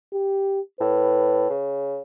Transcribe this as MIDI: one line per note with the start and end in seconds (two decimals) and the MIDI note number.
0.13 0.60 67
0.80 1.47 45
0.80 1.54 71
1.50 2.01 49